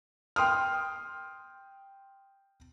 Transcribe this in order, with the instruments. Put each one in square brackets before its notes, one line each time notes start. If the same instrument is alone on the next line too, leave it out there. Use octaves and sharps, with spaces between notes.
[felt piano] G5 C6 D#6 F6